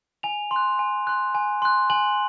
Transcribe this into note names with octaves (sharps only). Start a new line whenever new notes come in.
G#5 F7
C6
F#6
G#5
C6 F#6
G#5
C6 F#6
G#5 F#7